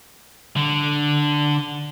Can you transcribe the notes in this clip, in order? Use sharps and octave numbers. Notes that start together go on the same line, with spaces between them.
D3